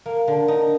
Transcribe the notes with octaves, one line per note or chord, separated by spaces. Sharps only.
A#3
D3
D#4